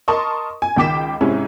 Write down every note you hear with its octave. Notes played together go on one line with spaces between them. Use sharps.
A#4 D#5 A5 C6 C#6 D#6
G#5
C#2 D#3 G5 D6 B6 E7
G#2 C3 C#4 E4